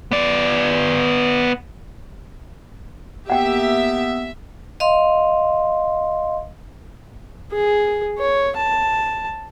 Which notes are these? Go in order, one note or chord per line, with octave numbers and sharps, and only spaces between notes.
B3 D5
A#3 B3 G4 E5 F#5 G5
D#5 F5 C6
G#4
C#5
A5